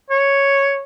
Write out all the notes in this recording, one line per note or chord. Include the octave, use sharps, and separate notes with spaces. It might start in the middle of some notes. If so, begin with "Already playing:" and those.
C#5